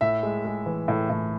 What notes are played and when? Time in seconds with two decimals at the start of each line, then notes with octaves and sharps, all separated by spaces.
0.01 A2 E5
0.23 G#3
0.45 G#3
0.66 E3
0.88 A2
1.10 A2